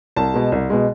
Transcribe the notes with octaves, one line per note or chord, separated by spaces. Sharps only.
C2 A5
B2 G#3
C2
B2 G#3